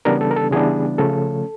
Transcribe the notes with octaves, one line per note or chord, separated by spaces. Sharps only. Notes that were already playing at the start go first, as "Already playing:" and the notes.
C#3 E3 G3 B3 D4 A#4
A4
A#4
A4
C#3 E3 G3 B3 D4 G#4
C#3 F3 A3 C#4 A4